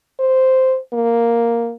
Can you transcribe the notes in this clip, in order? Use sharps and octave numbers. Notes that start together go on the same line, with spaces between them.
C5
A#3